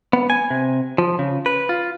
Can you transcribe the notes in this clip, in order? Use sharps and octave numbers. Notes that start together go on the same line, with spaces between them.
B3
G#5
C3
F3
C#3
B4
F4